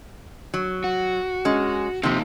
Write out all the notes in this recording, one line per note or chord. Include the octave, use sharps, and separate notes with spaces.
F#3
F#4
G#3 C#4
C3 F3 A#3 D#4 F4